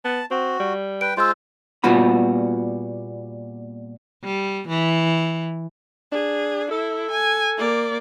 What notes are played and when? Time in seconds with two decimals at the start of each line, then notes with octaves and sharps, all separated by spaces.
0.05 B3 A5
0.31 C4 F#4
0.60 G3
1.01 B4 G5 D7
1.17 G#3 F4 C5 C6 E6
1.84 A#2 G3 B3 F4 F#4 B5
4.24 G3
4.69 E3
6.12 D4 G#4
6.71 E4 A4
7.11 G#5
7.58 A#3 D5